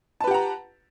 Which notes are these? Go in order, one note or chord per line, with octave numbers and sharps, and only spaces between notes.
G4 B4 F#5 A5 A#5